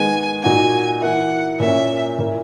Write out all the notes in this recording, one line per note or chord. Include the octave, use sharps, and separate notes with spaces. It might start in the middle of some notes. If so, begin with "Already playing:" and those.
Already playing: D#3 G#3 B3 G#5
A#2 A#3 D#4 F#4 G#5
E3 A#3 E4 F#5
A#2 A#3 C#4 E5
A#2 A#3 E4